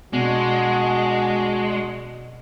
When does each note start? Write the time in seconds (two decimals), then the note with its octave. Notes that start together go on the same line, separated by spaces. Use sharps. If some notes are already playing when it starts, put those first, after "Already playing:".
0.13 B2 G#3 D4 F#4